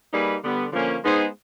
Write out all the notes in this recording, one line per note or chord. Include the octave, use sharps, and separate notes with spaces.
G3 A#3 D#4 G#4 B4
D3 G3 B3
D3 F3 A#3 C#4
G#3 B3 D#4 G#4 C5